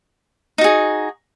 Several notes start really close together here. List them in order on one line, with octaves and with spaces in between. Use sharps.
D#4 F#4 G#4